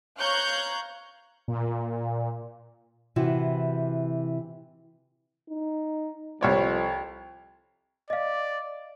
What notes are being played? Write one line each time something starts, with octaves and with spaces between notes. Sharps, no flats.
C#5 F5 A#5 C#6 F#6 G6
A#2
C3 E3 E4 F#4
D#4
C2 F2 C#5 D5
D5 D#5 F5